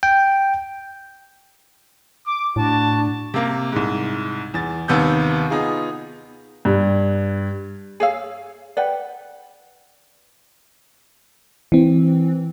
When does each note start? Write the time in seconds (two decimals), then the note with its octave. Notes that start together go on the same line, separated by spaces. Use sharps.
0.03 G5
2.26 D6
2.56 A2 D4 F#4 A5
3.34 C3 A#3
3.72 C2 G#2
4.54 E2 A6
4.88 D#2 C3 B3 F#5 E6 G6
5.50 B3 D#4 F4 G#4
6.65 G2
8.00 G#4 C#5 F5 G#5 E6
8.77 B4 D5 F#5 G5
11.72 E3 C4